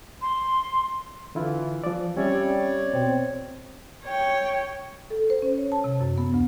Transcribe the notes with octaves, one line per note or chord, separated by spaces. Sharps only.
C6
D3 E3 E4 F4
F3 D5
G3 C4 C#4 C#5 D5 E5
B2 C4
C#5 G5
A4
C5
C#4
C#5
A5
C3
F#2
B3
D2